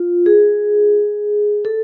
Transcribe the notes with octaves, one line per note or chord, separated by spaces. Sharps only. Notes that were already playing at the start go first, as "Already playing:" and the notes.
Already playing: F4
G#4
A4